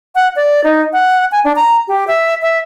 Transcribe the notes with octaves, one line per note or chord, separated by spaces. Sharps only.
F#5
D5
D#4
F#5
G#5
D4
A#5
G4
E5
E5